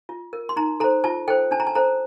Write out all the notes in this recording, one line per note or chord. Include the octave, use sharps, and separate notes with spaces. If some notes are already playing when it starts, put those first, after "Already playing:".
F4
A#4
C6
D#4 A#5
A4 C5 A#5
F4 A5
A4 C5 G5
D4 A5
A#5
A5
A4 C5 A#5